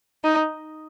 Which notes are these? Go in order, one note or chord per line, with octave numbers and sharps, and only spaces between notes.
D#4